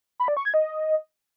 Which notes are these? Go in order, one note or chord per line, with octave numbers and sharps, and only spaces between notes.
B5
D5
C#6
G#6
D#5